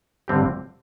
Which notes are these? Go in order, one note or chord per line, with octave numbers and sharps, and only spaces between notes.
G2 D3 G3 C4 G4